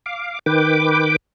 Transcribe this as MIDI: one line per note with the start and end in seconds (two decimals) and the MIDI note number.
0.06 0.39 77
0.06 0.39 86
0.46 1.16 51
0.46 1.16 71
0.46 1.16 79
0.46 1.16 86